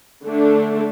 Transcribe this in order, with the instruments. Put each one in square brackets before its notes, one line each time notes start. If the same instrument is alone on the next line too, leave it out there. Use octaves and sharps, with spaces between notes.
[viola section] D3 A3 D4